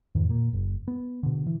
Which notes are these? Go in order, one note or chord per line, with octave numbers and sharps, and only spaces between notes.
F2 G#2 D#3
A#2 A#3
F#1
B3
B2 D3
E3